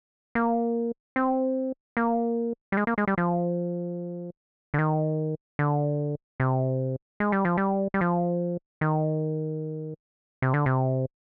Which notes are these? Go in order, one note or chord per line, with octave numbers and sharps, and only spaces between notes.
A#3
C4
A#3
G3
G#3
A#3
G#3
G3
F3
D3
D#3
D3
C3
G#3
G3
F3
G3
G3
F3
D#3
C3
D3
C3